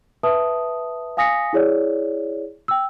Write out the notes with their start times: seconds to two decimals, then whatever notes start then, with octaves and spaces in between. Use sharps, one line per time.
0.23 B4 E5 A5 D#6
1.17 F5 G#5 D#6 A#6 B6 C#7
1.53 E4 G#4 C#5 D5
2.68 G5 E6